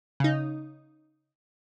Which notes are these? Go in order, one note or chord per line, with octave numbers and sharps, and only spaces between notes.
C#3 D#4